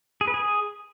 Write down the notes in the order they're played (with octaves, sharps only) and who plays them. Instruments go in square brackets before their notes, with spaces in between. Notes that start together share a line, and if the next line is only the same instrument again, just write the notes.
[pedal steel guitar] G#4
B4
G#4